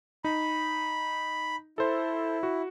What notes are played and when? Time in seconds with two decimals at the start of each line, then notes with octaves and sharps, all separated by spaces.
0.24 D#4 B5
1.78 E4 A4 C5
2.43 F#4